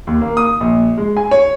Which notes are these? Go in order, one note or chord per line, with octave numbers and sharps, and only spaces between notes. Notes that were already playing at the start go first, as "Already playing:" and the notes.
D#2
A#3
D#6
A#1
G#3
G#5
C#5